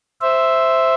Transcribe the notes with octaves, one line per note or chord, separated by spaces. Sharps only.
C5 E5